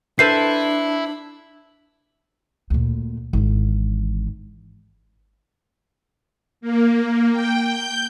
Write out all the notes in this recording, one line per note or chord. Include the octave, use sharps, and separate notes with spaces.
D4 E4 A4 B4 C5 C7
D2 A#2
G#1 E3
A#3
G5
G6